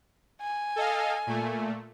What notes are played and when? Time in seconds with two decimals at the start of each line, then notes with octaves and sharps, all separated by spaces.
0.42 G#5
0.76 A4 D#5 F5
1.27 A#2 A3